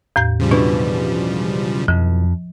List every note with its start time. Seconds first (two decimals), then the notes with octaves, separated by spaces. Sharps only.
0.16 E2 A2 G6
0.40 C#3 F3 G3
0.51 B1 B2 E3 D4
1.88 F2 F3